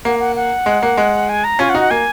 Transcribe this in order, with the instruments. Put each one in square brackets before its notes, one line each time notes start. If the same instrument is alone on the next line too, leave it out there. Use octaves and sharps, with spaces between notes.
[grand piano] A#3 [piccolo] F#5
[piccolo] F#5
F#5
[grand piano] G#3
A#3
G#3
[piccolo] G#5
A#5
[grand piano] C#4 F4 [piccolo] G#5
[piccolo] F#5
[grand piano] D#4 F#4
[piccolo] F#5
[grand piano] A#3 [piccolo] G#5